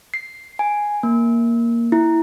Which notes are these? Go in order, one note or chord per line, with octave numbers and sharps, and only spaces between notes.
C7
G#5
A#3
E4